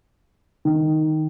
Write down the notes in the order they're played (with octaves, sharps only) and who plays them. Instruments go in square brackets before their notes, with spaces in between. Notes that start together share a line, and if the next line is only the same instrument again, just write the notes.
[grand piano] D#3